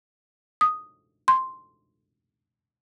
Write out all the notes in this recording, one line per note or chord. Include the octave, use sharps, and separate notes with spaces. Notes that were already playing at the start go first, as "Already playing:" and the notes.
D#6
C6